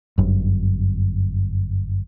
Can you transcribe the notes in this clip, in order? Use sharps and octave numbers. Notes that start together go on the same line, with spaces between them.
G1 F#2